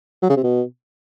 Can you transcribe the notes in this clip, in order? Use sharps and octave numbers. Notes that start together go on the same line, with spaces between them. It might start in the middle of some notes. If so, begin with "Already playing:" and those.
F#3
C#3
C3
B2